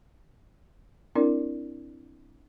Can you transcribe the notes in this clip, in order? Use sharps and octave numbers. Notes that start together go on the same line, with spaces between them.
C4 D4 E4 A#4 D5